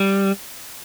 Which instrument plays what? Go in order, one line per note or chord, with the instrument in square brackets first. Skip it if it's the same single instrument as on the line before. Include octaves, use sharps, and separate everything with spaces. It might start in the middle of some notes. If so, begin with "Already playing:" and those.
Already playing: [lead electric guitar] G3